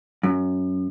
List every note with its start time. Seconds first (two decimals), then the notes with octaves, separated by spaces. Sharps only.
0.23 F#2